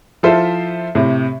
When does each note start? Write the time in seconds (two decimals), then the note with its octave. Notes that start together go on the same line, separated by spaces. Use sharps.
0.23 F3 E4 F4 A4 C5 E5
0.95 A2 C3